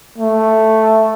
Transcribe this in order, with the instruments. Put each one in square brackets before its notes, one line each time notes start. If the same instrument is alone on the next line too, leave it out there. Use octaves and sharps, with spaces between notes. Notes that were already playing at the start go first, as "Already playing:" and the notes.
[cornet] A3